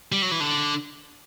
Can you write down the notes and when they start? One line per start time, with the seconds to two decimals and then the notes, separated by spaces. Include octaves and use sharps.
0.12 G3
0.22 F#3
0.31 E3
0.40 D3